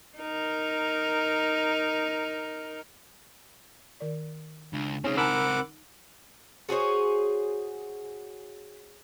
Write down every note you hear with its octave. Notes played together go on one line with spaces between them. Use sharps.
D#4 A#4
D#3 A#4 D5
C#2 D4
C#2 C4 C#4 D#4 G#4
D#4 A#4 F#5 G#5 A5 B5 D6 E6
F#4 G#4 C5 C#5